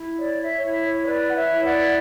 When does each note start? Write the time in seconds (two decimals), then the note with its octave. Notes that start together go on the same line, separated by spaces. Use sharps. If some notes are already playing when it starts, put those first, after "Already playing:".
Already playing: E4
0.19 C#5 D5
0.41 C#5 E5
0.63 E4 C#5 E5
0.85 C#5
1.06 B4 D5
1.29 F#5
1.35 C#5 E5
1.50 E4
1.64 D5 F#5